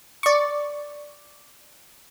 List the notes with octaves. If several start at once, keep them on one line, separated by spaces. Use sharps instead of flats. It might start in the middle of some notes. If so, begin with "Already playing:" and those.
D5 C#6